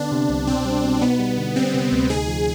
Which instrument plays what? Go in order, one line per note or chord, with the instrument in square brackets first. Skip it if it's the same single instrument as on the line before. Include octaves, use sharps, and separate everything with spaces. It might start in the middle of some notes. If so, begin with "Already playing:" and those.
Already playing: [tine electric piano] D3 B3 [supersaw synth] D4
[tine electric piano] C3
C2
[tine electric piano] B2 [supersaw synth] C4
[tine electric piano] G3
B2
[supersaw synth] B3 [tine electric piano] D#4
[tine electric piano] G3
D3
[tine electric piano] G3 [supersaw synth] C4
[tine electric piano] C3
D2
[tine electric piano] D#4 [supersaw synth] G#4
[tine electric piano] F3